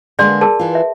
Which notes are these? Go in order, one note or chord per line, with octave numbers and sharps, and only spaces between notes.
D3 G#3 A#3 G#4 D5 C6
G#4 A#4 A5
E3 F4
E5